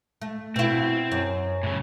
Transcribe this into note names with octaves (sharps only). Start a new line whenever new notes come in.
A3
B2 C4 E4
F#2
A2 C#3